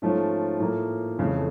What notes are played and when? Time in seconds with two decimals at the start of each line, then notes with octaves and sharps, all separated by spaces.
0.02 G#2 F3 A3 C#4
0.60 A2 F3 A#3
1.18 F2 C#3 E3 A3